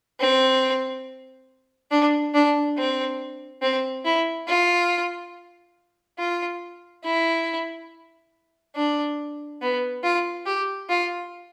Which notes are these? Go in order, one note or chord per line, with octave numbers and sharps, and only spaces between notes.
C4
D4
D4
C4
C4
E4
F4
F4
E4
D4
B3
F4
G4
F4